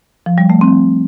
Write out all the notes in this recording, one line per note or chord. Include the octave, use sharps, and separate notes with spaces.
F3
G3
A3
C4